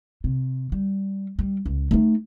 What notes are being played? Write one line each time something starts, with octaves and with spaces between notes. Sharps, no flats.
C3
G3
G3
C#2
A3 D#4